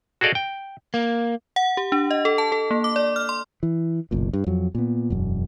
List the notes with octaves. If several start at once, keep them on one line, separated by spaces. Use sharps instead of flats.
F#4 G#4 A4 D5 D#5 F5
G5
A#3
F#5
G4
D4
D#5
A4
A5
A4
A#3
D6
D5
F6
C6
E3
F#1 B1 A#2
G2
F2 F#3
A#2 B3
E1 F#2